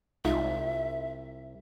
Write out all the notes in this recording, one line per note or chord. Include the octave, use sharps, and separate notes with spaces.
C2 G#3 D#4 F4 E5